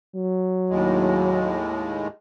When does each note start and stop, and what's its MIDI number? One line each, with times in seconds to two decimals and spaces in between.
0.16 1.67 54
0.70 2.08 39
0.70 2.08 45
0.70 2.08 56